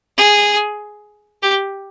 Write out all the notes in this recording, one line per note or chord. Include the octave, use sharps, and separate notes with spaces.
G#4
G4